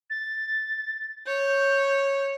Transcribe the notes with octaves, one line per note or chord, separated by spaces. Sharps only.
A6
C#5 G6